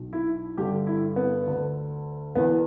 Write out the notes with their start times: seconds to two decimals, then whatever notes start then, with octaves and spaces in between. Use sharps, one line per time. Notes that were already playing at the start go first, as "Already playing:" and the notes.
Already playing: B1 B2
0.13 E4
0.58 G1 G2 D3 G4
0.87 E4
1.16 B3
1.47 D2 D3
2.35 E1 E2 E3 B3